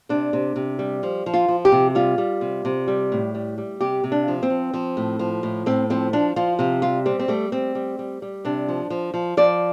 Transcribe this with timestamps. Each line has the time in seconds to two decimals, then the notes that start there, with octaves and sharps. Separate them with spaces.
0.09 C3 D4
0.33 C3
0.56 C3
0.79 G3
1.03 F3
1.26 F3
1.34 F4
1.48 F3
1.65 G4
1.72 C3
1.95 G3 F4
2.18 G3
2.41 C3
2.65 C3
2.88 G3
3.12 A2
3.35 G3
3.58 G3
3.81 C3 G4
4.04 C3
4.12 D4
4.28 F3
4.43 C4
4.50 F3
4.74 F3
4.97 A2
5.19 F3
5.43 A2
5.66 A2 C4
5.90 F3 C4
6.13 F3 D4
6.36 F3 F4
6.59 C3 F4
6.82 G3 F4
7.05 G3 C4
7.19 C4
7.28 G3 A3
7.52 G3 C4
7.75 G3
7.99 G3
8.22 G3
8.45 C3 D4
8.68 F3
8.90 F3
9.14 F3
9.37 F3 D5